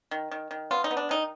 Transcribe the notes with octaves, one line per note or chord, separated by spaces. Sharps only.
D#3
D#3
D#3
B3 F4
D#4
B3
D4
D#3 D#4